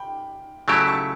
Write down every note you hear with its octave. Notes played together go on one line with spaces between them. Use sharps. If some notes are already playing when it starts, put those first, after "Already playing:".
Already playing: G5 B5
C#3 F#3 A3 E4 G4 A5 C#6
A5 C#6